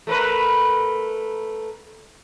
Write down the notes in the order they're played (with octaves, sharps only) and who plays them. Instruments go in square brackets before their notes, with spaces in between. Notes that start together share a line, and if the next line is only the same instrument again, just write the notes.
[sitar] A3 A#4 B4